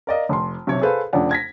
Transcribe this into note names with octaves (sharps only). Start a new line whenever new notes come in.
A#4 D5 D#5 F5
F1 C6
B1 C3 C#5
G#4 A4 B4 C5 F5
F1 F2 C#3 D4 F#5
G#6 A#6 B6